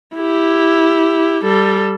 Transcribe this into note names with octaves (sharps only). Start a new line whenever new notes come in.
E4 G4
G3 A4